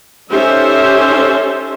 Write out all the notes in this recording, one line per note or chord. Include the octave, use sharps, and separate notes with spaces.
C#4 D#4 G4 A4 C5 E5